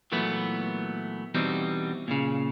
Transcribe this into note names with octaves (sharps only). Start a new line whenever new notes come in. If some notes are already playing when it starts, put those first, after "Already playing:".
A#2 E3 F#3 A3 B3
E2 B2 E3 G3 C4 D#4
A#2 C#3